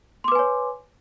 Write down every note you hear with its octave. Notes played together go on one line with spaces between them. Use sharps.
B4 C#5 G#5 C6 D6